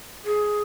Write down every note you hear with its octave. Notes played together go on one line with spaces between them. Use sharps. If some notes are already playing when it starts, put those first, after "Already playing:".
G#4